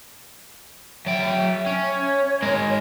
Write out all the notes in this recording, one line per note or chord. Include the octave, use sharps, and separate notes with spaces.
F#3 E5 G5
C#4
C#5
G#3 A#4